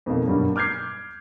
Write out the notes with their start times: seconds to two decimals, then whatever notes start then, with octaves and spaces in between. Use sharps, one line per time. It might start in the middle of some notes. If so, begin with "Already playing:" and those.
0.06 F2 B2 D#3 A#3
0.26 G2 B2 F#3 G3 A#3
0.56 D6 F6 G6 G#6 C7